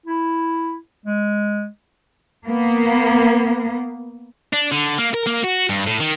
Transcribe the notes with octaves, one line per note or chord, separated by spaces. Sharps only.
E4
G#3
A#3 B3
D4
D3
A#3
A#4
A#3
F#4
G2
A2
D#3